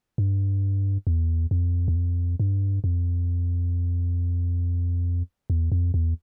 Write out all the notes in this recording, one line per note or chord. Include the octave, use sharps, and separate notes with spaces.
G2
E2
F2
E2
F2
G2
F2
E2
F2
E2